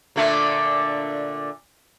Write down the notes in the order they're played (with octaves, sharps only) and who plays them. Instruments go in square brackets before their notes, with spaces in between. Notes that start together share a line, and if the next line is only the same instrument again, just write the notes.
[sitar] A#2 D3 A3